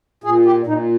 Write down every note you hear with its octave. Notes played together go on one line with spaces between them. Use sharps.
A#2 G#4
G4
A#2 D#4